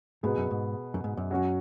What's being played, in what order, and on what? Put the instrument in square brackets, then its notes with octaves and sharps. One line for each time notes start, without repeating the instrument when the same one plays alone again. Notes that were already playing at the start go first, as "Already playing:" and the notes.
[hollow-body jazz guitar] G#2 [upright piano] B2 B3 G#4
[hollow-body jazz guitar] F#2
G#2
F#2
G#2
F#2
[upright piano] F#3 C#4 F#4